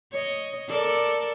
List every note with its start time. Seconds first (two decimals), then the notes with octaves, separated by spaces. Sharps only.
0.12 C#5 D#5
0.68 A4 A#4 D5